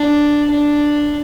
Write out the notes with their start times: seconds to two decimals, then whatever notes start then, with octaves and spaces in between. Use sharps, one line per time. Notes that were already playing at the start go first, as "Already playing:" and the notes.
Already playing: D4
0.51 D4